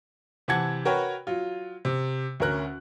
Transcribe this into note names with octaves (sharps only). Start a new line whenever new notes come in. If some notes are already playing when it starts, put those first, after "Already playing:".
C3 E3 F#5 A5 G#6
F#4 A#4 B4 C#5 G5
F#3 F4
C3
D2 C#4 A#4 F#6